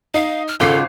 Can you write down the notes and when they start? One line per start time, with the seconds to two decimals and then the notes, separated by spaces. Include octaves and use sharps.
0.14 D#4 F5
0.48 F6
0.60 G#1 C#3 F4 A4 D6 C7